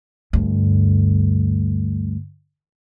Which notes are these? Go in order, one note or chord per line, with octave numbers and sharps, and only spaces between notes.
D2 G2